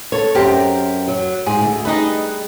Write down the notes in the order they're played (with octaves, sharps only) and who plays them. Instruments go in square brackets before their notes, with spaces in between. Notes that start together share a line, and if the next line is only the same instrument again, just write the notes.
[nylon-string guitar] A4 C#5
[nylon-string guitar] F#2 C4 [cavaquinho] G4 A#4
[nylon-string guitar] F#3
[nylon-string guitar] G#2 [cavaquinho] G#4
[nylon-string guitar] D2
[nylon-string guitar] G3 D#4 G#4 [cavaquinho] B4 D#5